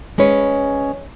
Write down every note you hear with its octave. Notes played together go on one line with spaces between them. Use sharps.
G#3 C#4 B4 C#5